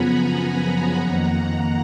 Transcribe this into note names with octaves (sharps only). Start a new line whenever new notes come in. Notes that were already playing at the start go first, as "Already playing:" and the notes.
Already playing: F#2 C#3 F3 B3 F#5 G#5 A#5 B5
F2 D#3 A#3 F#5 A#5